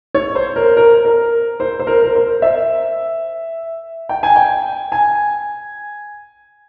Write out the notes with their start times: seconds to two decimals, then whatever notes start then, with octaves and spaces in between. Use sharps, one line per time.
0.15 C#5
0.35 C5
0.56 A#4
0.77 A#4
1.05 A#4
1.60 C5
1.79 C5
1.87 A#4
2.03 A#4
2.15 C5
2.42 E5
4.09 G5
4.23 G#5
4.36 G5
4.92 G#5